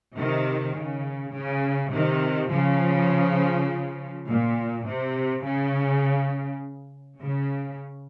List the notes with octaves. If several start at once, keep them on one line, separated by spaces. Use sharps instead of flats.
C3 D#3
C#3
C#3
C3 D#3
C#3 F3
A#2
C3
C#3
C#3